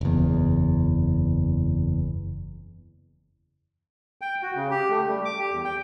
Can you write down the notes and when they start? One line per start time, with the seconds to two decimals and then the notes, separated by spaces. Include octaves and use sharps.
0.01 F#1 E2
4.21 G5
4.43 F#4
4.55 C#3
4.71 G4
4.90 A3
5.08 G3
5.25 D6
5.39 G4
5.52 E2
5.64 G5